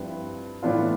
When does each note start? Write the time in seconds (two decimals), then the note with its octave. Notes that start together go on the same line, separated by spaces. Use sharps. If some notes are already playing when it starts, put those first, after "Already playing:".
Already playing: G2 F3 C4 E4 B4
0.63 A2 E3 B3 D4 F4